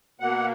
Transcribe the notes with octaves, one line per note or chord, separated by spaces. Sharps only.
B2 A#3 F#5